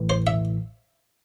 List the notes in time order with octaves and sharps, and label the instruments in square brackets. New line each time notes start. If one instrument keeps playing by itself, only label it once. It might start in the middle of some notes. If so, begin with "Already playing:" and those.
Already playing: [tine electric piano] A1 A2 E3
[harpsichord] C5
E5